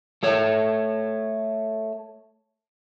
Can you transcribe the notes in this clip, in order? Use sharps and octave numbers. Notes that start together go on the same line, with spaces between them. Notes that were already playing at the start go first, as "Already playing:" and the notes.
A3 A4 C#5